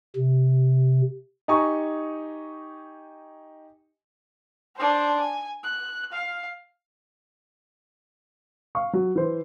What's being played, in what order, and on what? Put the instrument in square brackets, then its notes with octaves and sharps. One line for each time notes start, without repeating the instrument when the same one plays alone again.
[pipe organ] C3
[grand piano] D#4 G4 G#5 A#5 C#6 D#6
[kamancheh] D4 C5
G#5
F#6
F5
[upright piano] F5 C#6
F#3
E3 C5